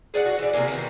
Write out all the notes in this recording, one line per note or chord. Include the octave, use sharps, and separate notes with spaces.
G#4 D5 E5 F#5
F#4
E3 D5
C3 F3 A#3 G#4
D#3 E3